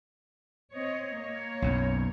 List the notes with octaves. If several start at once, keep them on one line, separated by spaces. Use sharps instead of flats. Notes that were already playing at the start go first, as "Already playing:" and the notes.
C4 C#5 D#5
A#3 C#5
B1 F#2